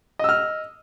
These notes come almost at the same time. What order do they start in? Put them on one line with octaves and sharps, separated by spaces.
D#5 E6 F6